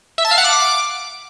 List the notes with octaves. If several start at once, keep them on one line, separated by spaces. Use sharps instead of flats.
E5
A5
F5
F#5
D6